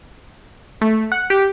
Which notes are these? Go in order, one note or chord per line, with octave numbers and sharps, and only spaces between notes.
A3
F#5
G4